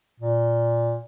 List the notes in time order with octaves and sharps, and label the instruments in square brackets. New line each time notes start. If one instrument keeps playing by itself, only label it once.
[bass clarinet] A#2